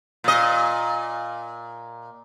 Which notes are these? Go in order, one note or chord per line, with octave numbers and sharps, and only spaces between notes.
A#2 D#5